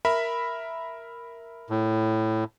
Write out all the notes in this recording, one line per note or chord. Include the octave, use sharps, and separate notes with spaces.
A#4 E5 B5
A2